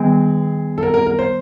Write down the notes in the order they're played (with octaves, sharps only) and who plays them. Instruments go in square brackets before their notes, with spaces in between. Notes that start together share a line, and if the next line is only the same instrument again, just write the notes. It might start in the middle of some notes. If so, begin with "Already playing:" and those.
Already playing: [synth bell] D#3 G3 B3 [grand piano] G#4
[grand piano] A4
A#4
A#4
A#4
C5